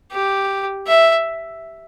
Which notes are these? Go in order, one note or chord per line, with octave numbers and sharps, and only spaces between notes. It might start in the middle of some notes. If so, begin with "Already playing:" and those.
G4
E5